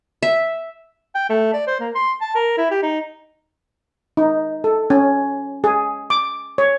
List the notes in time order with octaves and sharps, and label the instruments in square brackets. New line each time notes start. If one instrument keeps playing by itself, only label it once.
[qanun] E5
[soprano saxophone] G5
A3
D5
C5
A#3
C6
A5
A#4
E4
G4
D#4
[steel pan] D#4
A4
C#4
G#4
D6
C#5